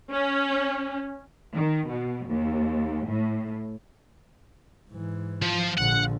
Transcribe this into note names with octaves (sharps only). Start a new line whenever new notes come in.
C#4
D#3
B2
D#2
A2
G#2 E3
F3
A#1 D3 F#5